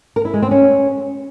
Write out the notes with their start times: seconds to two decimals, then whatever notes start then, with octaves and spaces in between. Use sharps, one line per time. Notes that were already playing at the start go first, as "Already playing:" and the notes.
0.16 A#4
0.25 E4
0.34 G#3
0.42 C4
0.51 C#4